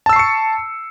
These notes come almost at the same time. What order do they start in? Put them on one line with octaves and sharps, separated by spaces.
A5 E6 C7 C#6 C#7